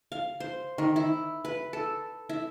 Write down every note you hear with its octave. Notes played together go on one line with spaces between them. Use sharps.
F5
C5
D#3
E4
B4
A4
E4